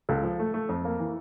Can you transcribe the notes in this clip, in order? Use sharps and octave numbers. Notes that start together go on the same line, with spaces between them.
C#2 A4
F3
A3
A3
F2
A#3
E3